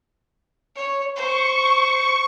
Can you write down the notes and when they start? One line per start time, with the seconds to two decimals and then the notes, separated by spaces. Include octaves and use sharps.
0.75 C#5
1.16 C5 C#6